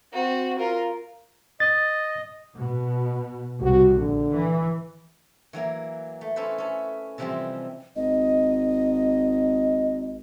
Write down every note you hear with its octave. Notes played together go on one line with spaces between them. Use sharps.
C4 F#4
F4 A#4
D#5 A6
B2
C2 F#4
A#1 D3
E3
E3 F#3 A#3
A3
C#4 E4 A4 B4 C5
C#4 A4
C3 E3 F3 G3 G#3 C4
G#1 D#5